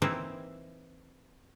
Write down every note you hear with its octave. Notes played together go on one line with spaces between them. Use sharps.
E3 A#3 C4 D#4 E4